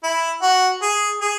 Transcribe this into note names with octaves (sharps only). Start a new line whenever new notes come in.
E4
F#4
G#4
G#4